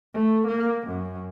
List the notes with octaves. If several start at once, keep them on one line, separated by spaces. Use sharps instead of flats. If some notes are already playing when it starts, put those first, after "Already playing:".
A3
A#3
F#2